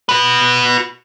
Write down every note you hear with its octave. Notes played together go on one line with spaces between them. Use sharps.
F#4 B4